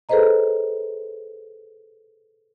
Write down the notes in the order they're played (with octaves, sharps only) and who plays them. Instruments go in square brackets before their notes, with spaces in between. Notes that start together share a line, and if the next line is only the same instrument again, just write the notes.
[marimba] G#4 A4 B4 C5 D#5 A#5